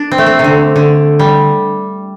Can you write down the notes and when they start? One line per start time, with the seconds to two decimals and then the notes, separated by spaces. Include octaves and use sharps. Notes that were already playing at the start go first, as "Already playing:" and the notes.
Already playing: D4
0.11 C4
0.18 A3
0.26 C4
0.39 C3
0.44 D3
0.76 D3
1.19 G3